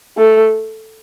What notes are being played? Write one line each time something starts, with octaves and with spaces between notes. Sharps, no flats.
A3